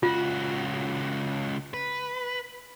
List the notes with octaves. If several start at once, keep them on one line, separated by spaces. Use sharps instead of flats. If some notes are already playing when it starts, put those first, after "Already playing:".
C#2 F4 F#4
B4